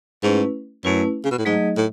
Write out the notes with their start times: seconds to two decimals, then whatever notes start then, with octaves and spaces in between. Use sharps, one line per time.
0.23 G#2 A3 C#4 E4 B4
0.84 F#2 A3 C#4 E4 B4
1.24 C#3
1.31 B2
1.38 A2
1.45 G#2 F#3 A3 D#4 G#4 D#5
1.77 A2